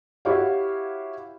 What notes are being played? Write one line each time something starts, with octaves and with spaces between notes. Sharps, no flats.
E4 F#4 G4 C#5 F5